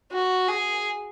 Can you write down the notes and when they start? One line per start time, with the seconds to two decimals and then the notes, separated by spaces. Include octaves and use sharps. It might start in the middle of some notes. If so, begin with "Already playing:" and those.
0.11 F#4
0.48 G#4